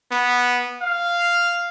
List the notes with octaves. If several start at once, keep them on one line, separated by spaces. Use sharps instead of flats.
B3
F5